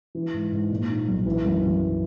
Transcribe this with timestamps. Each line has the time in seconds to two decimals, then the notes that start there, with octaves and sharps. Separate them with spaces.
0.15 E3
0.34 G#2
0.52 G#2
0.71 A#2
0.89 D#4
1.08 B1
1.26 E3
1.45 F#2
1.63 F#2